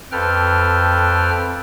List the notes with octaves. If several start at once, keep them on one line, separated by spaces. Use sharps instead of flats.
F2 A4 B4 G5 F6